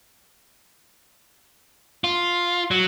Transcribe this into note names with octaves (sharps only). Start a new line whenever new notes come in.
F4
F#3